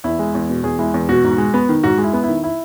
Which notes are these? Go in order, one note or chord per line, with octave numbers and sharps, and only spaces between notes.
E2 E4
G#3
E2
B2
E2 G#4
G#3 E4
E2
B2 F#4
G#2
G#3
B3
D#3
G#2 F#4
G#3
E4
B3
D#3 E4
E4